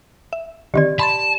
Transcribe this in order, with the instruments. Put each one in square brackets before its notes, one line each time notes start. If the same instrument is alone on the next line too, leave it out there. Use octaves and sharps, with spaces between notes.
[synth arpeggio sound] E5
[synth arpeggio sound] D3 D#3 C4 [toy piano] G4 D5
[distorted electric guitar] A5 [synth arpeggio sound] B5 C6 A6